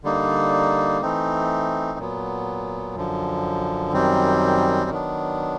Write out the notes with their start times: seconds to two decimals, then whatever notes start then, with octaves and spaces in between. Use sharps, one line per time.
0.03 D3 G3 A#3 D#4
1.02 E3 A3 C4 D#4
1.99 A#2 F#3 B3
2.95 F#2 D3 F3
3.93 F#2 D#3 G3 C4
4.90 D#3 F#3 B3 D4